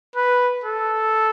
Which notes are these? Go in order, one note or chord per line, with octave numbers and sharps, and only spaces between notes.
B4
A4